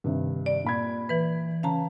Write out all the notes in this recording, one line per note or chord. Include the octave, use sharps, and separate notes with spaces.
G2 C3 D#3
D5
A#2 B5 G#6
E3 B4
C#3 C#4 F5 A5 A#5